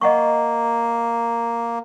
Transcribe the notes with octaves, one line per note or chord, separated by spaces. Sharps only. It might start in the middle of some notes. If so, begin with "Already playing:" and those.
A#3 D#5 F#5 C#6